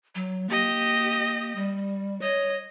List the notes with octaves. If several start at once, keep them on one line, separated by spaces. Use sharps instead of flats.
F#3
A#3 G4 D#5
G3
C#5 D#5